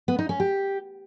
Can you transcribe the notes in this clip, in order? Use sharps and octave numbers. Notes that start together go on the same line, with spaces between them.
B3
D#4
C#4
G4